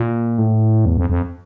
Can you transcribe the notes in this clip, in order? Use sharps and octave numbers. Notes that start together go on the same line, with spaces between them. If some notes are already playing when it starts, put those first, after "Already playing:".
Already playing: A#2
A2
E2
F2
F2